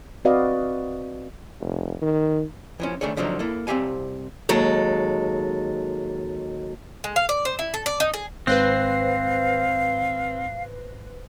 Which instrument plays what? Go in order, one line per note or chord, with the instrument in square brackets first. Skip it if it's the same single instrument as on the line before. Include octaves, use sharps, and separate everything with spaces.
[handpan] C4 F#4 B4 D5 D#5 F5
[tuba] F1
D#3
[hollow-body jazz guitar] E3 F3 C#4
D#3 A3 D4 G#4 C#5
G#2 D3 F3 F#3 D4 D#4
A#3 E4 A4
C2 C4 C#4 G4 F5 G#5
[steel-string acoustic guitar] D#2 F#3 G#3 A4
[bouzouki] G#3
F5
D5
C5
E4
A4
D5
D#4
G#4
[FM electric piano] G#1 A#6 C7 [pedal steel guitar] C4 [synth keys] B4 C5 F#6 [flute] F5